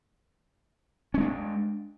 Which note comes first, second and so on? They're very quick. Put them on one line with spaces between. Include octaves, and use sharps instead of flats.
C#4 G#3 D4